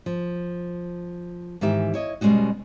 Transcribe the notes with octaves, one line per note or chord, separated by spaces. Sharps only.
F3
G#2 D#3 E3 G4 E5
E4 C#5 D#5
B2 G3 G#3 C#4 D#4 F#4